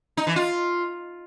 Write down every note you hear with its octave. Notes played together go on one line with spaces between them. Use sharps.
D#4
E3
F4